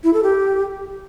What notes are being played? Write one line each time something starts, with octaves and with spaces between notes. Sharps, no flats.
E4
A4
G4